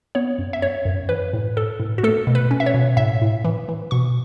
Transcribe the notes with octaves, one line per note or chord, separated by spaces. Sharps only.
B3 C#5
F#2
E5
F#2 C#5
F#2
E3 B4
A2
A2 A4
A2
F#4
A3 A4
B2
B4
C#4
E5
C#5
B2
A2 E5
A2
E3
E3
B2 C#6